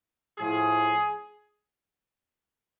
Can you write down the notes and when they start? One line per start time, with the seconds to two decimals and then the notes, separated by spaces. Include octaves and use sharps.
0.38 A2 F3 G#4